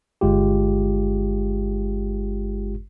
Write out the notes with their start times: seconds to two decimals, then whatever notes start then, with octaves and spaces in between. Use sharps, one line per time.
0.21 G1 G#3 F4 G4